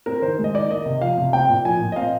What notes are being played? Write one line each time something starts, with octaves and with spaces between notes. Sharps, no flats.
C4 A#4
D#3 C5
G#3
D#5
D#3 D5
A#3 D#5
C3
F3 F5
C3
C4 G5
A#2
F3 G#5
A#2
D#5
C4 F5